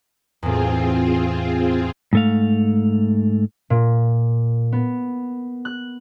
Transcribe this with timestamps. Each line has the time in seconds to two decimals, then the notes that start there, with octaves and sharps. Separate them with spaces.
0.43 E2 A2 C4 F4 G#4
2.13 G#2 A3 F5
3.70 A#2
4.72 B3
5.65 F#6